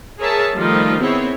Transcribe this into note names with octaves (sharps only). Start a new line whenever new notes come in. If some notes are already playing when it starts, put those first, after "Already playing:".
G#4 A#4 C#5 E5 A5
D#3 F3 G3 A3 D#4 F4
B3 C4 E4 G#4 C#5